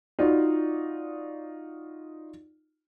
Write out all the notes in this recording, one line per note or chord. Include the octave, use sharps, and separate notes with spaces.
D#4 F4 F#4 D5